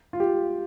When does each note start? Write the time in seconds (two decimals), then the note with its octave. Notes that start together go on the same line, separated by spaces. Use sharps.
0.13 F4
0.20 G4